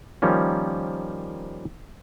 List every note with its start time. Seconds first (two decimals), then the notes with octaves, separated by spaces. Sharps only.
0.22 D#3 F3 G3 A#3 C#4